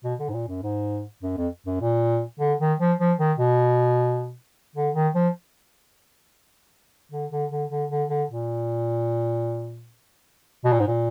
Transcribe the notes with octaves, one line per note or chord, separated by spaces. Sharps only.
B2
D3
G#2
A#2
F#2
G#2
F#2
F2
F#2
A#2
D3
D#3
F3
F3
D#3
B2
D3
D#3
F3
D3
D3
D3
D3
D3
D3
A#2
B2
A#2
G#2
A#2